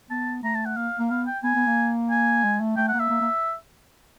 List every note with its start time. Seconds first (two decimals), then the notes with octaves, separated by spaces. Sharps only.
0.10 B3 A5
0.43 A3 A#5
0.55 A5
0.65 F#5
0.76 A#3 F5
0.99 A#3
1.10 B3 F5
1.27 G5
1.43 B3 G#5
1.55 B3
1.67 A#3
2.10 G#5
2.44 G#3
2.60 A3
2.77 A3 G5
2.88 F#5
2.94 A#3
2.99 E5
3.10 A#3
3.21 A#3